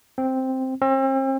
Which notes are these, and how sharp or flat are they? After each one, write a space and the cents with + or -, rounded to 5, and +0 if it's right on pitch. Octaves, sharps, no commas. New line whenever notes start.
C4 +0
C4 +40